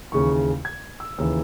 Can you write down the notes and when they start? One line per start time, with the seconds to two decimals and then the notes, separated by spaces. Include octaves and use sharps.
0.12 D#2 C#3 E3 C#6
0.65 G#6
1.00 E6
1.18 D#2 C#3 E3 E6